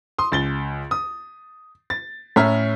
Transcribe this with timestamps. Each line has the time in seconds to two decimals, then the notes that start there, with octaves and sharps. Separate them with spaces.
0.18 C6 D#6
0.32 C#2 A6 G7
0.91 D#6
1.90 A6
2.36 A2 C#4 E5 A#5 F6